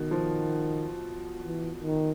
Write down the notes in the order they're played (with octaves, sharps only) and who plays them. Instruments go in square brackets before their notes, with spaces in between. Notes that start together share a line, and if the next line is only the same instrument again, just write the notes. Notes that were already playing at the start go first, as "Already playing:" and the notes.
Already playing: [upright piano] B2 [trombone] D#3
[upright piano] F3
[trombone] E3
D#3